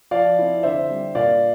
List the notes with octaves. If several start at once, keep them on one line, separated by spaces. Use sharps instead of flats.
F3 D5 F5
C4 E4
D3 C5 E5
G3 C4
A#2 D5 F5